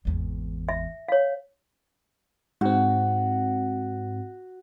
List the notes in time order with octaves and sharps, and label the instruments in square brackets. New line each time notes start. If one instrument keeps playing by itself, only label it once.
[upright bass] G#1 E2
[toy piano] E5
C#5 F5
[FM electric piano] G#2 C4 [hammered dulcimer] F#4